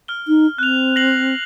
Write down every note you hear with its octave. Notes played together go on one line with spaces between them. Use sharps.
F6 G7
D#4
C4 F#6 F7
A#6 C7 F#7